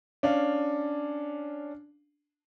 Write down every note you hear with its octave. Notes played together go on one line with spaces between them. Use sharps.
C#4 D4 F5